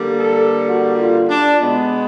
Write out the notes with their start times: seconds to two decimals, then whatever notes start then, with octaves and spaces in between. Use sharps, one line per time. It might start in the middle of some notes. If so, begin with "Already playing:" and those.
Already playing: D3 G3 A#3
0.19 A4
0.67 F#4
0.97 F4
1.29 D4
1.60 B2 G#3 B3